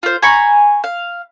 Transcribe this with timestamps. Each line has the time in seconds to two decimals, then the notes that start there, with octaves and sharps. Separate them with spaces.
0.03 F4 C5
0.22 G#5 A#5 B5 C#6
0.84 F5